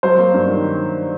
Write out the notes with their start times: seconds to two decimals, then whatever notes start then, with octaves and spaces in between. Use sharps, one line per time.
0.03 F#3 C5
0.19 A#3
0.34 G2
0.50 D#3